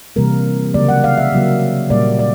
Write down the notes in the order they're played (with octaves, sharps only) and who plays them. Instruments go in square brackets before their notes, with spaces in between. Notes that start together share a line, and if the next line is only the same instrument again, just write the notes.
[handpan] C3 E3 G3 A#3 A#4
C#3 F#3 A#3 D5
F#5
F5
E5
C#3 F#3 A#3
A#2 G3 A#3 D5
D5